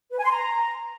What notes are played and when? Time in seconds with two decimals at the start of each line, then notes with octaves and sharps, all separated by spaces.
0.12 B4
0.18 G#5
0.25 C6
0.31 A#5